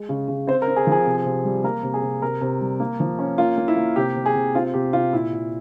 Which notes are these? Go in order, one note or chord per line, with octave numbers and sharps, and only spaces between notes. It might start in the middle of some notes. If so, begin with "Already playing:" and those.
Already playing: G#3
C#3
C#3
C4 C5
A#4
C4
G#4
F3 G#4
C3
C3
G3
A#3 A#4
C3
G#4
C3
C3 A#4
C3
G3
A#3
F3
C#4
A#3 F4
A#3
E4
A#3
C3 G4
C3
G#4
C3
C4 F4
C3 G4
C3 F4
A#2 E4
A#2